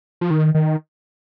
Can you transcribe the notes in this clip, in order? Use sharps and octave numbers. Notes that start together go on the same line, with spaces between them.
F3
D#3
D#3